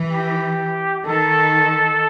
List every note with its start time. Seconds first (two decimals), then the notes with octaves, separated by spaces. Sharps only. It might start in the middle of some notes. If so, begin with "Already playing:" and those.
Already playing: E3
0.09 G4
1.05 D#3 A4